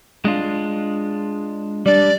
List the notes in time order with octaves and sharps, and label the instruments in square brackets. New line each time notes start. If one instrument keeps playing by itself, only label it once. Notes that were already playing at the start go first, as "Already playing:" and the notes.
[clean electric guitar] G#3 D4 F4
[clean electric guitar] G3 D4 [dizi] D5